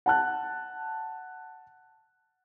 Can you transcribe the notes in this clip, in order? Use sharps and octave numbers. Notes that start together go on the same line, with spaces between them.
F#5 A5 F#6